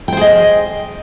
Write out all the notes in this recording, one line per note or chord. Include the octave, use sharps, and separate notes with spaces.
G#4 C5 D#5 G5